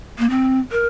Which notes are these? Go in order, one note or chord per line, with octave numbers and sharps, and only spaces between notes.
A#3
C4
A#4